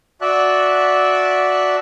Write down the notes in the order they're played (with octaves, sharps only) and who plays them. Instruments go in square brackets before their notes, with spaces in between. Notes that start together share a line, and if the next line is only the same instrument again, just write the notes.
[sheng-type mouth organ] F#4 D5 E5 A5 F#6